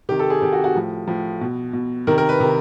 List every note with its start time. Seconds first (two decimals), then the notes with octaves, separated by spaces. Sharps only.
0.09 C3 D#3 G4
0.19 A4
0.30 G#4
0.42 C3 D#3 G4
0.53 F#4
0.64 F#4
0.75 A2 F3
1.08 A2 F3
1.41 B2
1.73 B2
2.07 C3 D#3 A#4
2.18 A#4
2.29 B4
2.40 C3 D#3